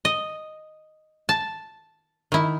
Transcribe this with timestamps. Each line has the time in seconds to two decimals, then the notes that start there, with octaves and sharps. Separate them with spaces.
0.05 D#5
1.29 A5
2.32 D#3 E4